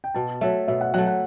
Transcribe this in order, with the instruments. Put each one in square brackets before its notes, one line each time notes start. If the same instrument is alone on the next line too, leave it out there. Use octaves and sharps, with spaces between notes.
[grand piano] G5
[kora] B2 [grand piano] A5
[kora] F#3 A3 [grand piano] E5
[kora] B2 [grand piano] E5
[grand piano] F#5
[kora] F#3 A3 [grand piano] F#5
[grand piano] F#5